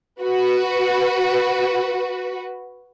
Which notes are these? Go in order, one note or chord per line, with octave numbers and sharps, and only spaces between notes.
F#4 B4